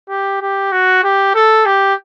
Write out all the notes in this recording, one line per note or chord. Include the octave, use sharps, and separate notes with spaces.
G4
G4
F#4
G4
A4
G4